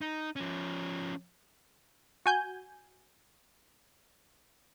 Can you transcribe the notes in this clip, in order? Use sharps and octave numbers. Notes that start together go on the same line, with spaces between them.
D#4
F3 C#4
F#4 G#5 G6